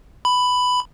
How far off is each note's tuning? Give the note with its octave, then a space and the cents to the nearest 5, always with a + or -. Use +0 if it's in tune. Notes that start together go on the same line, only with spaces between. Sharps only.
B5 +10